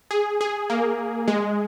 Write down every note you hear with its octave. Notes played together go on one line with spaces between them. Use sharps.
G#4
G#4
A#3
G#3